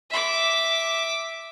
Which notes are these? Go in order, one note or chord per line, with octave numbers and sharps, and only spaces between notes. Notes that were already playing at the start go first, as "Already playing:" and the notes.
E5 D6